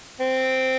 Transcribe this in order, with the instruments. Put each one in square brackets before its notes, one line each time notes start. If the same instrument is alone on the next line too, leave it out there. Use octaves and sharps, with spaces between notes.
[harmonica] C4